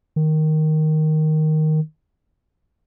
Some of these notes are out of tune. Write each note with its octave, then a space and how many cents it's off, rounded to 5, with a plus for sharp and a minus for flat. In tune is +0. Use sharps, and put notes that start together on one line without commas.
D#3 +0